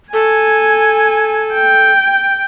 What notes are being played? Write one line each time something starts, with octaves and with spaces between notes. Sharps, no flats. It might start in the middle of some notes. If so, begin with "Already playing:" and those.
A4 G#5
G5